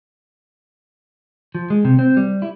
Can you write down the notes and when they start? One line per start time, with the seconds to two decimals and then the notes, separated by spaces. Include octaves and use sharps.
1.55 F3
1.70 G#3
1.85 C3
1.99 C4
2.17 G3
2.42 E4